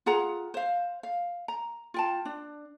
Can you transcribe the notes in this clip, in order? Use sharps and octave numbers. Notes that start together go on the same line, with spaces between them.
F4 G#4 F#5 A#5
C5 F5
F5
A#5
F4 G5 A5
D4